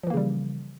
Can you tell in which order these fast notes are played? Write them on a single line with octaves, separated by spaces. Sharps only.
F3 E3 A#3 C#3 G3